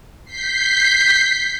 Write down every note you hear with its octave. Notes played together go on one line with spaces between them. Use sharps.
G6 B6 C7